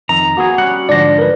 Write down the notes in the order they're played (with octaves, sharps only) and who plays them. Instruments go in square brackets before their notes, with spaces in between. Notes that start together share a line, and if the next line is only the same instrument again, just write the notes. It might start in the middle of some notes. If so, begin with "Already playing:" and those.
[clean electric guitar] F2 D#3 [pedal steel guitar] A#5
[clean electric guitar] A#3 B3 G#4 [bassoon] F#4
[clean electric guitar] G3 C#4 [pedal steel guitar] F#5
[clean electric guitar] G#2 D3 F3 [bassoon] D4 [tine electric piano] D5 A#6
[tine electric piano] A#4 B4